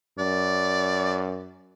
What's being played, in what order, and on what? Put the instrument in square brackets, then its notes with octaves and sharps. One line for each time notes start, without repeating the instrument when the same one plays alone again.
[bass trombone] F#2 [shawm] D5